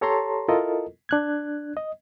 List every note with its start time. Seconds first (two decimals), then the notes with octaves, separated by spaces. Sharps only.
0.01 G4 A4 C#5 A5 A#5 C6
0.49 E4 F4 A4 A#4 D#5
1.09 D4 F#6 G#6
1.77 D#5